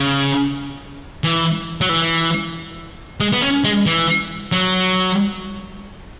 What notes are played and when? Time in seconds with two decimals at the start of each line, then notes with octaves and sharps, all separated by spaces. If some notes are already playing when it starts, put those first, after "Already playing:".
Already playing: C#3
1.24 E3
1.81 F#3
1.89 E3
3.20 G#3
3.32 B3
3.42 C#4
3.64 G#3
3.86 E3
4.52 F#3